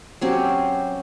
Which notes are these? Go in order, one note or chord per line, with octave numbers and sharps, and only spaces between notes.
F#3 C4 C#4 G4